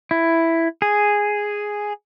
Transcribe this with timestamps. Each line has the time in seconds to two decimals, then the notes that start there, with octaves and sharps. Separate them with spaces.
0.11 E4
0.82 G#4